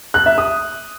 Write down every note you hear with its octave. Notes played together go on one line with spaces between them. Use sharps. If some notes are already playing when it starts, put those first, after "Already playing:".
F#6
E5
D#6